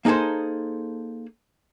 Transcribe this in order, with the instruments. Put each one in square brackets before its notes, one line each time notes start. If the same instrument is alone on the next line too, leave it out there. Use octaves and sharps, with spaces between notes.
[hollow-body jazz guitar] A#3 D#4 G#4 A4 C5